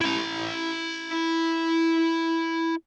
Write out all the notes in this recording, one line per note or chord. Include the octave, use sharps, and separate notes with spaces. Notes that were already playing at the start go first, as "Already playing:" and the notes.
E4 A#5